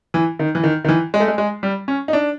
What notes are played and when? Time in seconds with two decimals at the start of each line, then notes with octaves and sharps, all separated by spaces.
0.14 E3
0.39 D#3
0.55 E3
0.63 D#3
0.84 D#3
0.88 E3
1.14 G#3
1.20 A3
1.28 G#3
1.38 G#3
1.63 G3
1.88 C#4
2.08 D#4
2.13 D4